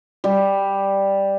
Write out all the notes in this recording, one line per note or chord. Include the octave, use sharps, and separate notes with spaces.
G3